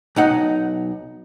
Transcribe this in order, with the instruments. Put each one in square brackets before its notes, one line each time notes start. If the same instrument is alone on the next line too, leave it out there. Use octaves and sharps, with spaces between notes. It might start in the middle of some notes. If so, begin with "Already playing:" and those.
[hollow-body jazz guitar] B1 D#4 F#5